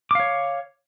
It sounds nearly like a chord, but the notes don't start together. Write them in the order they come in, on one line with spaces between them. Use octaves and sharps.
D6 F5 C#5